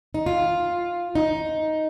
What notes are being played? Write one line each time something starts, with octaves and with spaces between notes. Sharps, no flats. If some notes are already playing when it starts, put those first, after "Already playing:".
D#4
F4
D#4